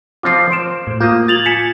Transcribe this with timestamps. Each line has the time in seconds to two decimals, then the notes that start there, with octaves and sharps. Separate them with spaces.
0.23 F3 C4 F4 D6 C7
0.51 C5 C6 D7 E7
0.87 A2
1.00 A#3 F4 D#6 G6
1.28 F4 G#6 A6 F7 F#7
1.46 G#5 B6 C#7 E7